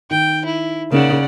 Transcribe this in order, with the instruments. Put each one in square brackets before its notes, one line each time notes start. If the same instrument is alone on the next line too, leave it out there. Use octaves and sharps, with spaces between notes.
[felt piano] D#3 [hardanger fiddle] G5
[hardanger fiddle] E4
[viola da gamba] C#3 [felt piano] A#3 D#4 E7 [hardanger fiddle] D5 F#5